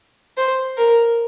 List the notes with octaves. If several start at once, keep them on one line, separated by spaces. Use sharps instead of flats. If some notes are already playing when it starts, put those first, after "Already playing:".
C5
A#4